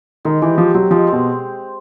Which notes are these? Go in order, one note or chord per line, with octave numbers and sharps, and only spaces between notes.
D#3 G#3
E3 G4
F3 G4
F#3 C4
F3 G#3
C4
B2